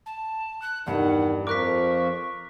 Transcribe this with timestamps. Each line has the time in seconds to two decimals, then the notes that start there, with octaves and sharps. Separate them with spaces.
0.06 A5
0.62 F#6
0.86 E2 G2 D#3 F#5
1.47 F2 F3 A#4 C#6 D6 F#6 B6